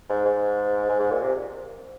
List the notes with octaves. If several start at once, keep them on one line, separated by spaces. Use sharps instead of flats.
G#2
G#2
G#2
G#2
A#2
C3